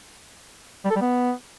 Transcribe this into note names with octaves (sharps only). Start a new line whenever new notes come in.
G3
A4
G3
B3